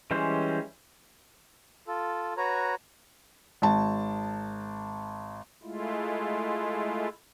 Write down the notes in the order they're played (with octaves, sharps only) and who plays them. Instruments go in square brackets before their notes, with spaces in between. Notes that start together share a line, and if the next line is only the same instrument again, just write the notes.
[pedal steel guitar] E3 G3 G#3 C#4 C5
[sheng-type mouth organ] F4 A4
F#4 B4 C#5 A#5
[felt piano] G#1 A5
[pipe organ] G#3 A3 E4 F4